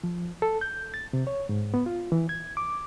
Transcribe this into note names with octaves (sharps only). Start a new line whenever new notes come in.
F3
A4
G6
A6
C3
C#5
G#2
B3
F4
E3
G#6
D6